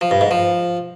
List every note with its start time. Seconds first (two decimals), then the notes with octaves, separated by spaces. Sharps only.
0.01 F3
0.11 G2
0.21 G#2
0.31 F3